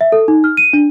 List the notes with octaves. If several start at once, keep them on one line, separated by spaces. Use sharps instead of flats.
E5
A4
D#4
F6
D#7
D4